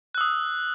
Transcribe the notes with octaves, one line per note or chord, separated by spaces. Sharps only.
D#6 E6 F#6